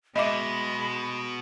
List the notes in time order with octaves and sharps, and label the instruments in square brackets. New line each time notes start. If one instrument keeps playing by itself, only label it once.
[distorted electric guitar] B2 [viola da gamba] G#3 [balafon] D#5 E5 D6 [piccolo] B5